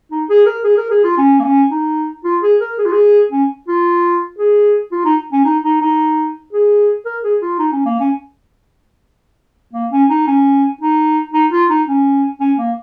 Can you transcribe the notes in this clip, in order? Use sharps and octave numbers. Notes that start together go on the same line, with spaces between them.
D#4
G#4
A#4
G#4
A#4
G#4
F4
C#4
A#3
C#4
D#4
F4
G#4
A#4
G#4
F4
G#4
C#4
F4
G#4
F4
D#4
C#4
D#4
D#4
D#4
G#4
A#4
G#4
F4
D#4
C#4
A#3
C#4
A#3
C#4
D#4
C#4
D#4
D#4
F4
D#4
C#4
C#4
A#3